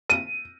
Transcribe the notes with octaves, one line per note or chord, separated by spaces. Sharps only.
D#7